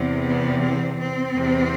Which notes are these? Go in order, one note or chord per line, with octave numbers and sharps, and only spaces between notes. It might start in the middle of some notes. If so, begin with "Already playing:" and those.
Already playing: E2 C3 E3
B3
C4
C4
E2 C3 E3